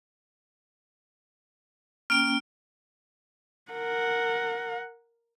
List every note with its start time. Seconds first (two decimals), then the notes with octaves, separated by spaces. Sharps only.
2.10 A#3 C#4 G5 F6 D7
3.71 A#4 F#5